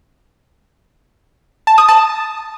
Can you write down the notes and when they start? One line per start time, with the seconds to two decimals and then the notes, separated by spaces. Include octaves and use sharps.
1.67 A5
1.78 D#6
1.89 A5